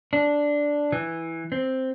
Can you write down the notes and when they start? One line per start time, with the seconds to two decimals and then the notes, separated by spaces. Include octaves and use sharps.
0.13 D4
0.92 E3
1.52 C4